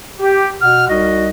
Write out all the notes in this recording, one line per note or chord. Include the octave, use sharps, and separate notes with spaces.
G4
B2 F#5 F6
C2 D#4 F#4 D#5